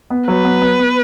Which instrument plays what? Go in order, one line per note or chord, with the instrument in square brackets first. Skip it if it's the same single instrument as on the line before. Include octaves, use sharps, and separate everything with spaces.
[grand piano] B3
[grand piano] F#3 [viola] B4
[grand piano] B3
B3
B3